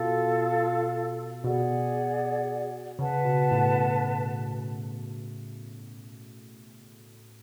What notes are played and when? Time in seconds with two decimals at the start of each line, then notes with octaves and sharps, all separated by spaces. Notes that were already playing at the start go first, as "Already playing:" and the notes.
Already playing: B2 F4 A4 F5
1.43 B2 G#4 D5 F#5
2.99 C#3 B4 F#5 A5
3.25 B2
3.51 A2